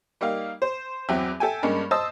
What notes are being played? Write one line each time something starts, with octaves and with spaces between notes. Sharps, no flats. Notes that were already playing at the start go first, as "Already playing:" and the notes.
G3 A#3 D#4 F5
C5
E2 F#3 C4 E5
A4 E5 G5 G#5
G2 G#3 A#3 C#4
C5 D#5 A5 D#6 E6